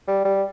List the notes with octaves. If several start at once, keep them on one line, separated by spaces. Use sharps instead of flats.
G3
G3